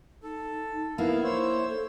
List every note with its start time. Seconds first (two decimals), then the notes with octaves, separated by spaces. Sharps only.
0.23 D#4 A4
0.98 A#3 B3 E4 F5
1.24 C5 C#5 E6
1.69 A4